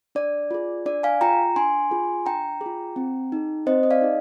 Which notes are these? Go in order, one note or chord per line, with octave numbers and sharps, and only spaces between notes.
D4 D5
F4 G#4
D4 D5
F5 G#5
F4 G#4 G5 A#5
D4 G#5 C6
F4 G#4
D4 G5 A#5
G#4
F4
C4
D#4 G#4
C4 C5 D#5
D#5
D5 F5
D#4 G#4